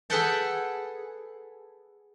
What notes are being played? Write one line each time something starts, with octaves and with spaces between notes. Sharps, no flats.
G#4 A4 B4 F#5 G5 A5